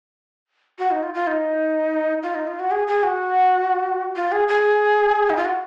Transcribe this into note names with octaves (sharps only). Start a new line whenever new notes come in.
F#4
D#4
F4
F4
D#4
F4
D#4
F4
F#4
G#4
G#4
F#4
F4
G#4
G#4
D#4
F4
F#4